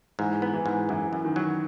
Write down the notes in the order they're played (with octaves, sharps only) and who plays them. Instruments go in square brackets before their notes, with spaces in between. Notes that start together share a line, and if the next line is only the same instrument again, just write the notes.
[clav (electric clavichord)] G#2 [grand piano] E3
[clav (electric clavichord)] B3
[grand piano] E3
[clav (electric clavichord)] G#2
[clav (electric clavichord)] F#2 [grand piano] E3
[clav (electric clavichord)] F#2
[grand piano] D#3
[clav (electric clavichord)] F#3